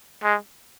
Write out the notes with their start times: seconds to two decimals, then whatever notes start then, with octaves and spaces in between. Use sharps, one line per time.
0.23 G#3